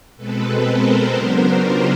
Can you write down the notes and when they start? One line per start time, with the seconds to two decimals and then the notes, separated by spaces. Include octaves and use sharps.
0.17 B2 G#3 C4 A4 B4
0.64 A#4 C5
1.12 C#3 F#3 B3 D4
1.59 F4 G4